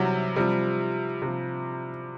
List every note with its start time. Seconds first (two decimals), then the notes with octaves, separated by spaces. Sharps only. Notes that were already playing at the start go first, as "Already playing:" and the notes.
Already playing: C3 E3 F#3 G3
0.36 C3 F3 G3
1.22 C3 F3